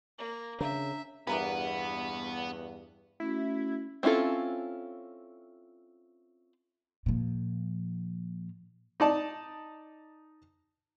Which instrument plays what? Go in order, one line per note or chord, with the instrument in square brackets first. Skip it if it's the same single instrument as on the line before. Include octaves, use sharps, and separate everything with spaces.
[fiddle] A#3
[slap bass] C#3 [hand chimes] D4 A#5 [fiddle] E5
[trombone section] E2 G2 [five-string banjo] E3 A#4 B4 [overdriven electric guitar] B3
[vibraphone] A3 C#4 F#4 [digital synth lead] E4
[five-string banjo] C4 C#4 E4 F4 A4
[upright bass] A#2 F3
[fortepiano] D#4 D5 A5